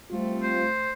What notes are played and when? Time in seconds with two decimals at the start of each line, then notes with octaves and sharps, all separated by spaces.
0.11 G3 A3 C4 F4
0.43 C5